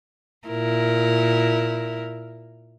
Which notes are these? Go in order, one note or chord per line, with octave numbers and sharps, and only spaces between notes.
A#2 E4 A#4